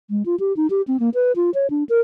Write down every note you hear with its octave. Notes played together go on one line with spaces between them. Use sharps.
G#3
F4
G4
D#4
G4
C4
A#3
B4
F4
C#5
D4
A#4